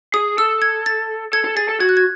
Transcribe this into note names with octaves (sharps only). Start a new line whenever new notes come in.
G#4 D#6
A4 E6
G#6
A6
A4 G#6
A4
G#4 A6
A4
F#4 G#6
F#6
G#6